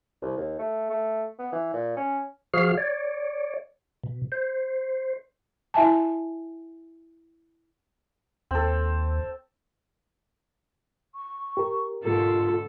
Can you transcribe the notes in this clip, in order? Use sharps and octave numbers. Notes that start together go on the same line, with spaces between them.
C2
D#2
A3
A3
B3
E3
A#2
C#4
F3 F#4 G#4 F5 F6
C#5 D5
B2
C5
E4 E5 G#5 A5
D#2 C4 A4
C#6
G4 A#4
G#2 B2 D3 F4 A4